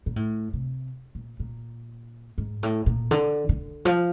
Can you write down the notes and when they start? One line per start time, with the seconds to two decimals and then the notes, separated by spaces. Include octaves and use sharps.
0.06 A#2
0.16 A2
0.53 C3
1.15 A#2
1.40 A#2
2.38 G#2
2.63 A2
2.86 A#2
3.11 D3
3.49 D3
3.85 F3